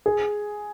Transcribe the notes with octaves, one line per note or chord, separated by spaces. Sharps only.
G#4